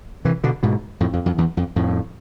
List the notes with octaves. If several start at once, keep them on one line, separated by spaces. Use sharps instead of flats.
C3 E3
B2 D3
G#2 B2
F2 A2
F2
F2
E2
F2
F2 A2